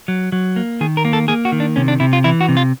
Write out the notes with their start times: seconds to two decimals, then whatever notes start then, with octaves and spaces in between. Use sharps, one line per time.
0.08 F#3
0.32 F#3
0.56 A#3
0.81 D#3 G#4
0.97 A#4
1.05 A#3
1.13 A4
1.28 A#3 G#4
1.45 F#4
1.52 D#3
1.60 D4
1.76 C3 C#4
1.88 D4
2.00 C3 E4
2.13 F4
2.24 E3 E4
2.41 F#4
2.49 C3
2.57 F4